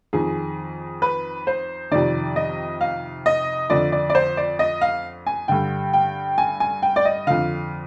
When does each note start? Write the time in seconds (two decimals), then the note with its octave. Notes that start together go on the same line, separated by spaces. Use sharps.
0.13 F2 D#3 G#4
1.02 B4
1.47 C5
1.91 F2 C3 D#3 D5
2.36 D#5
2.81 F5
3.26 D#5
3.70 F2 D3 D5
3.92 D5
4.10 D5
4.15 C5
4.37 D5
4.59 D#5
4.81 F5
5.27 G#5
5.48 G2 D3 G5
5.93 G5
6.38 G#5
6.60 G#5
6.83 G5
6.96 D5
7.05 D#5
7.27 F2 D3 F5